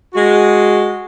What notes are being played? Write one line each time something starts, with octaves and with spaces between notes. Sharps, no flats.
G#3 F#4